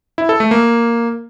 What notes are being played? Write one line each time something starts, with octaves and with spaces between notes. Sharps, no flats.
E4
A4
A3
A#3